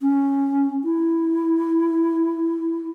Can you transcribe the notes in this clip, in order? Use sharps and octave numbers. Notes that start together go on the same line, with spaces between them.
C#4
E4